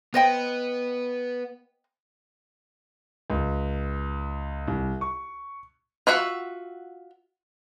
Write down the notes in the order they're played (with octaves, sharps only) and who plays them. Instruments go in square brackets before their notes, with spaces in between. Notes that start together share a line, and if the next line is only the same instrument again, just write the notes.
[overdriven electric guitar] B3 [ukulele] C5 D#5 G5
[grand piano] C#2
C2
C#6
[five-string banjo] F4 F#4 E5 F#5